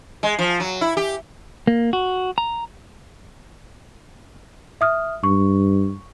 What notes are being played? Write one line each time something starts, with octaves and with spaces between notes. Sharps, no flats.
G#3
F3
F#3
E4
G4
A#3
F#4
A#5
E5 D#6 F6
G2 C#6